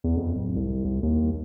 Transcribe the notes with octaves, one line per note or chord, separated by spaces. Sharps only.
E2
F2
D1
C2
C2
D#2